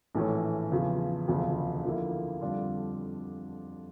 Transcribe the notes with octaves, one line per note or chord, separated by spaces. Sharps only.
A#1 A2 E3 A3 C#4
E2 C#3 F3
E1 D2 C#3 F3
D3 F3 A#3 E4
F2 D3 G3 D4 F4